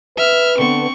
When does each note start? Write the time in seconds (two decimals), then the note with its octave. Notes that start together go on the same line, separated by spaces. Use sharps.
0.17 B4 E5 F6
0.59 D3 B3 C4 C#6